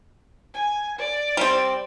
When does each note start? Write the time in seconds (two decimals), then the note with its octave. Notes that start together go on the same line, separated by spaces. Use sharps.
0.53 G#5
0.98 D5
1.37 G3 C4